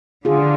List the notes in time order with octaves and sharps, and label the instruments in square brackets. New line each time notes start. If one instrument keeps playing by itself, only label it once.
[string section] D3 [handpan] F4 G#4